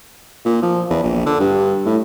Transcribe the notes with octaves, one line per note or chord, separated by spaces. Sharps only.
A#2
F3
E2
A#1
D3
G2
A2